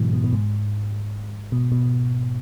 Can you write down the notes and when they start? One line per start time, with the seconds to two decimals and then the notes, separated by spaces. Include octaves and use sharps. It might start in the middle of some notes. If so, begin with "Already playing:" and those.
Already playing: G#2 B2 E3 F#3
0.13 B2
0.24 B2
0.33 G#2
1.52 B2
1.72 B2